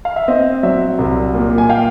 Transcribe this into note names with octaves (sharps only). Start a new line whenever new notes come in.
F5
E5
C4 D#5
F#3 D5 E5
C2
A#2
G#5
F5 G5